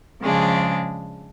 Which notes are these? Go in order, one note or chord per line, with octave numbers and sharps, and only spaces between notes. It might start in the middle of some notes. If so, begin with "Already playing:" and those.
C#3 F3 G#3 D4 G#4